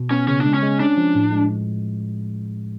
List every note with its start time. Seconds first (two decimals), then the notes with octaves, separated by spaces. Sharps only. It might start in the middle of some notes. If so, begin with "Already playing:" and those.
Already playing: B2
0.11 B3 C#4
0.28 C#3 C#4
0.41 G#3 D4
0.54 C#4
0.63 G#3
0.80 C#4 D4
0.97 F3
1.15 A2
1.32 G#3